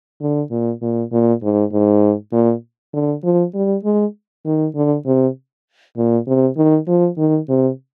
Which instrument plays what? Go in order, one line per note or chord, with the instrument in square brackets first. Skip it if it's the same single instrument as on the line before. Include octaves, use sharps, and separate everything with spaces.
[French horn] D3
A#2
A#2
A#2
G#2
G#2
A#2
D3
F3
G3
G#3
D#3
D3
C3
A#2
C3
D#3
F3
D#3
C3